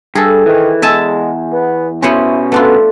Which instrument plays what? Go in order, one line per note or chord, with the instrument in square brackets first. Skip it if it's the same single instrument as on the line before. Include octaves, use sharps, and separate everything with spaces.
[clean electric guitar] G2 [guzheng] G#4 A4
[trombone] D#3 [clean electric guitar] E3
[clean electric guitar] E2 [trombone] G#3 [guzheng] E5 G#5 A5
[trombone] B3
[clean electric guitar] B2 C#4 [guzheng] B3 C5 C#5 [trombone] E4
[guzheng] A3 D4 F4 [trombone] B3